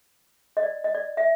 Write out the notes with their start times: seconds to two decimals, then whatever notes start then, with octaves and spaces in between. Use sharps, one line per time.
0.57 D#5
0.63 D5
0.84 D#5
0.95 D5
1.17 E5